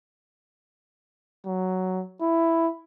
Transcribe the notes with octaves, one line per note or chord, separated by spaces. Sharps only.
F#3
E4